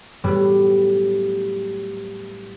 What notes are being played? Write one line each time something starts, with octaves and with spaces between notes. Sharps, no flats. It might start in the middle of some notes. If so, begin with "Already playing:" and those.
A2 F#3 G3 B3